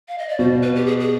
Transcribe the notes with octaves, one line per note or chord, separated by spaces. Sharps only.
F5
D#5
D5
B2 C5
B4
G4
G#4
G#4